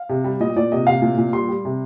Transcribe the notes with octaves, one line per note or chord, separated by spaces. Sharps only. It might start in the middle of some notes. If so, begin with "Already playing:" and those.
Already playing: F5
C3
G3
A#2 D#5
A#2 D5
C3 D#5
C3 F5
A#2
A#2
G3 C6
G3
C3